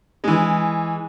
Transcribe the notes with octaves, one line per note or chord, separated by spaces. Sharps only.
E3 G#3